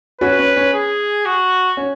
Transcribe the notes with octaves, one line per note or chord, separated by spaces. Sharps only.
C#4 F#4 B4
C#4
C#4
G#4
F#4
C#4